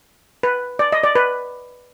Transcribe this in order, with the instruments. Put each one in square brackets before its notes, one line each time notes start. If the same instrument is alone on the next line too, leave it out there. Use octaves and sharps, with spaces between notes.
[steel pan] B4
D5
D#5
D5
B4